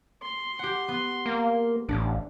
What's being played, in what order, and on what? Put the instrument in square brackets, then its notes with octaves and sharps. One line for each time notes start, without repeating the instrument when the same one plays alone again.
[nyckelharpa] C6
[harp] G4 F#5
B3
[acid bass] A#3
[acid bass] A1 [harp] D4